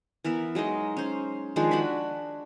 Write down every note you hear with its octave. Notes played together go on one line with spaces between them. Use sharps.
E3 B3 A#4 E5
F#3 G#3 D#4 D#5
C#4 C5
D#3 F3 G#3 D4
D4 F#4 G#5 B5